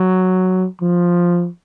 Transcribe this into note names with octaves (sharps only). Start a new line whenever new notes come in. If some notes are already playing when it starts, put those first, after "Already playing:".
Already playing: F#3
F3